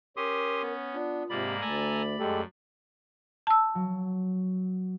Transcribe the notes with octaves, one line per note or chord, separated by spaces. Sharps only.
C#4 G4 A#4 C6 D#6
B3
D4 F4
G#2 C3 A#3 D5 B5
D2 A3 A4 G#5 A#5
F#2 G#3 G4 A4
A5 E6
F#3